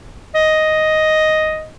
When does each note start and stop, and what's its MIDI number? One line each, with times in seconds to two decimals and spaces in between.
0.35 1.68 75